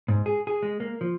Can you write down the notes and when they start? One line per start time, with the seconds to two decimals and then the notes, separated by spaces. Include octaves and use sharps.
0.08 G#2
0.26 G#4
0.47 G#4
0.63 G#3
0.80 A#3
1.01 F3